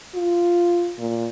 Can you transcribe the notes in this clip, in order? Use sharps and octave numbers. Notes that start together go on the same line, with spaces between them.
F4
A#2